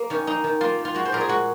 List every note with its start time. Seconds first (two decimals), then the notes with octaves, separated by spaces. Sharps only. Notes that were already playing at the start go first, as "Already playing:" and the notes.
Already playing: A#3
0.10 D#3 C#4
0.27 A#3 D#4
0.44 D#3
0.61 A#3 F4
0.79 D#3
0.85 F4
0.95 G#3 F#4
1.05 C5
1.12 A#2 A#4
1.21 G#4
1.28 G#3 F#4